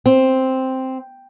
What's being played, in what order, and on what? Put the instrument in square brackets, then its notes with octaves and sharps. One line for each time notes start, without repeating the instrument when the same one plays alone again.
[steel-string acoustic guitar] C4